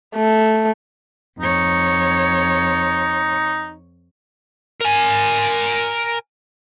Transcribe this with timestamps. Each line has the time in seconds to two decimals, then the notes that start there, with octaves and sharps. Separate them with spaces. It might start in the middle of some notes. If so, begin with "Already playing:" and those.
0.16 A3
1.39 F2 D#4 C#5
4.81 A#4 G#5